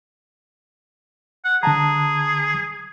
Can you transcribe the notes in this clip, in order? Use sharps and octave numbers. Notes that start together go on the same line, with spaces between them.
F#5
D3 G#4 A5 A#5